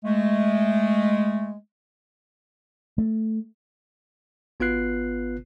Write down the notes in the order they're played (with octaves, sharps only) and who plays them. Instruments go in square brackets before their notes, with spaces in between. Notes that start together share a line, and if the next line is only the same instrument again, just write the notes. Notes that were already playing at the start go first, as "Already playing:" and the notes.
[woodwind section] G#3 A3
[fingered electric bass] A3
[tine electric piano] G#1 B3 F4 B4 F#6 C7